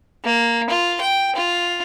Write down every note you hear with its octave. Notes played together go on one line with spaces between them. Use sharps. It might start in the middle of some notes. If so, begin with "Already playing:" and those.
A#3
F4
G5
F4